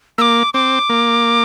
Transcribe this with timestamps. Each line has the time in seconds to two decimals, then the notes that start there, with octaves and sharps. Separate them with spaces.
0.18 A#3 D6 E6
0.54 C4 D6
0.90 A#3